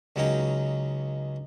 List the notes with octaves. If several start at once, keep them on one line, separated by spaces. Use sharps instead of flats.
C#2 C#3 F#3 C#4 D#4 G5